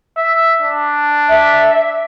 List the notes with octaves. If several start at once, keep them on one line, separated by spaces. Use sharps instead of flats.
E5
D4
E5